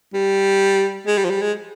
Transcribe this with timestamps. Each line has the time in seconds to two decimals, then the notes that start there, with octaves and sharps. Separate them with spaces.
0.14 G3
1.07 G#3
1.18 G3
1.25 F3
1.30 G3
1.42 G#3